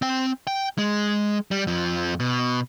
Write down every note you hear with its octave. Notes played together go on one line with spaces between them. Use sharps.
C4 G5
G5
G#3
G3
F2 F3
B2